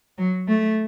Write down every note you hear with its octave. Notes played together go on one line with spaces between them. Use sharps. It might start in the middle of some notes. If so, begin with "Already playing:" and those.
F#3
A3